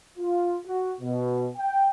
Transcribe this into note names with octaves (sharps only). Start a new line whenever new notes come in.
F4
F#4
B2
G5